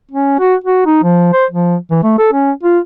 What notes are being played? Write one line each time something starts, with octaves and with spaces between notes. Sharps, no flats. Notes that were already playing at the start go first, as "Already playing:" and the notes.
C#4
F#4
F#4
D#4
F3
C5
F3
E3
A3
A4
C#4
F4